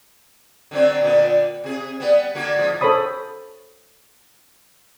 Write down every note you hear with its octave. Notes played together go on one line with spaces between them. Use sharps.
D3 F#3 C4
A#2 D3 B3
C3 G#4
G3 B3
D3 A#3 F#4
G#2 F3
A4 C5 C#5 B5 D#6